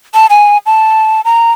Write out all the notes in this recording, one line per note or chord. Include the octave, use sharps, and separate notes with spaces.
A5
G#5
A5
A#5